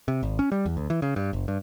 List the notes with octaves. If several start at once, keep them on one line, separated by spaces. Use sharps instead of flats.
C3
G#1
C#4
G3
E2
D2
E3
C#3
G2
F#1
G2